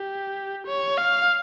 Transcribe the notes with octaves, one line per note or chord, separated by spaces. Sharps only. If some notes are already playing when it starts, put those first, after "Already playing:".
Already playing: G4
C#5
F5